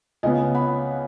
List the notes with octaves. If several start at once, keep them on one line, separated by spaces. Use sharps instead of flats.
C#2 C#3 B3 D#5 G#5
F#5 B5